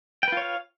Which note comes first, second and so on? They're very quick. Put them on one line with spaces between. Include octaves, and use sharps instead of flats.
G5 B4 F4 C#5 F5